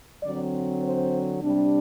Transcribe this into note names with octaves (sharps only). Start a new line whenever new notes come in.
D3 F#3 C4 D5
C5
C3 G3 D4